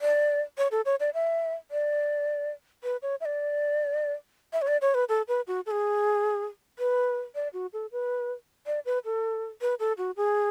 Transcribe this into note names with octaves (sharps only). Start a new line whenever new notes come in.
D5
C#5
A4
C#5
D5
E5
D5
B4
C#5
E5
D5
E5
C#5
D5
C#5
B4
A4
B4
F#4
A4
G#4
B4
D5
F#4
A4
B4
D5
B4
A4
B4
A4
F#4
G#4